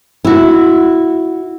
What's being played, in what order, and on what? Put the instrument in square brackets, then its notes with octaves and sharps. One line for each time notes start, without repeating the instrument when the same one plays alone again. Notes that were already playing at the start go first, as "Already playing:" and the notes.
[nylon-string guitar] E4 F#4